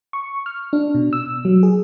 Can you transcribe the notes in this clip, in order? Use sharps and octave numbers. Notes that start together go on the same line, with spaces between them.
C#6
F6
D4
B2
E6
F#3
G#4